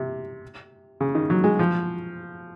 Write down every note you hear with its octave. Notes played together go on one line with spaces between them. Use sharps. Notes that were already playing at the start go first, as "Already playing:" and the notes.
Already playing: C3
C#3
D#3
F#3
G#3
F3